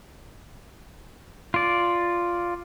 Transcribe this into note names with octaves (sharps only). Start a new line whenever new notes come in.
F4 D5